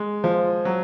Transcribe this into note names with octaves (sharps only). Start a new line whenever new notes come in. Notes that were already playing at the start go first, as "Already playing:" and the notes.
Already playing: G#3
F3
F#3